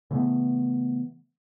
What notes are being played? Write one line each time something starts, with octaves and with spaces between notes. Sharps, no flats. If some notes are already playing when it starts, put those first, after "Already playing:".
C#3 E3 A3 B3